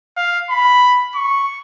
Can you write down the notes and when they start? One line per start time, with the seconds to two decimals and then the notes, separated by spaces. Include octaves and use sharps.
0.17 F5
0.50 B5
1.16 C#6